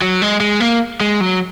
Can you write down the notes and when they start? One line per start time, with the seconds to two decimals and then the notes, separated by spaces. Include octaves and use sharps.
0.02 F#3
0.22 G#3
0.40 G#3
0.60 A#3
1.01 G#3
1.21 F#3